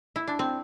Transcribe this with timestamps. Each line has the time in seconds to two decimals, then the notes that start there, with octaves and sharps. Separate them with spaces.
0.16 E4
0.27 D4
0.39 C4